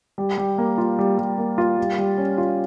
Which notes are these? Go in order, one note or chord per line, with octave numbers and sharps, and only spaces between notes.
G3
G3
A#3
F4
G3
G3
A#3
F4
G3
G3
C#4
F4